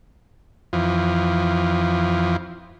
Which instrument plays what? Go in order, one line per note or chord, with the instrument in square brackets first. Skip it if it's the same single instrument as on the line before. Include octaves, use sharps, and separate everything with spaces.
[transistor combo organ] F2 E3 F3